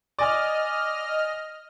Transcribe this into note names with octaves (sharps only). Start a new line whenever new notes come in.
D5 D#5 G#5 F6